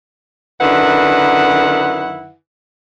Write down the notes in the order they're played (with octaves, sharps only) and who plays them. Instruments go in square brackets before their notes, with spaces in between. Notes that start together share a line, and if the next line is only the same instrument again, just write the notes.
[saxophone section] F#2 D3 D#3 E4 B4 F#5